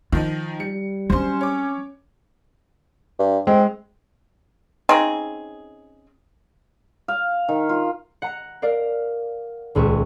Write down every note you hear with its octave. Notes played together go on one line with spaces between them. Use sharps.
D#3 F3 D#4 F4
G3 C#7
F#3 C4 C#4 C5 C6
C#5 D6
G2
G#3 C4
C#3 C4 D#4 G#4
F5
D#3
F4
F#5 A#5 C#7
A#4 D5 F5
D#1 C#2 B4 C#6